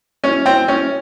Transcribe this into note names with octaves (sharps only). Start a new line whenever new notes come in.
C#4
C4
C#4